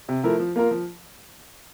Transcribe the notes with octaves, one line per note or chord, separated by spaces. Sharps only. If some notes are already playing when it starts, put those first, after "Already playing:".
C3
F3 A3 E4 A#4
F3
A#3 F4 A#4
F3